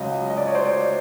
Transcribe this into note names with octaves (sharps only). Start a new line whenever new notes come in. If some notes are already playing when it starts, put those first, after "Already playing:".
Already playing: C#2 C#3 F#3 D#5
D#5
D5
C#5
C5 D5